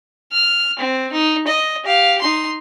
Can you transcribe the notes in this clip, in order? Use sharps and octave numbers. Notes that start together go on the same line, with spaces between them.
F6
C4
D#4
D#5
G4 F5
D#4 C6